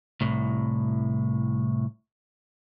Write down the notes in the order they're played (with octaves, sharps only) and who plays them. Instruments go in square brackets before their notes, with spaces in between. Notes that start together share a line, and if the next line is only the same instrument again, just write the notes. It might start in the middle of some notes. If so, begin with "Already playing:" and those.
[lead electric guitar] C2 A2